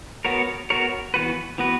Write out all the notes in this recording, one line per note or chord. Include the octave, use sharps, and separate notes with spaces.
B3 F#4 A#4 C#5
B3 F#4 A#4 C#5
E3 B3 F#4 B4
E3 B3 F#4 B4